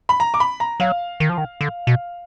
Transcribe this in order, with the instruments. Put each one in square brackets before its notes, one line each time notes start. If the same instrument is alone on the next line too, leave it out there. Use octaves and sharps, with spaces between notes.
[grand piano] B5
A#5
D6
B5
A#5
[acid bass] F#3 [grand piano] F5
[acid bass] D#3
F3
D#3
D3
B2